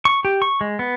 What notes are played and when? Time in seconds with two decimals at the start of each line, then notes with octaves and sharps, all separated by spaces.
0.05 C#6
0.25 G4
0.42 C#6
0.61 G#3
0.79 B3